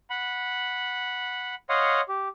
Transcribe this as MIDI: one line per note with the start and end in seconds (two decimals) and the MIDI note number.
0.10 1.55 78
0.10 1.55 83
1.69 2.01 73
1.69 2.01 75
1.69 2.01 77
1.69 2.01 78
1.69 2.01 84
1.69 2.01 87
2.08 2.28 67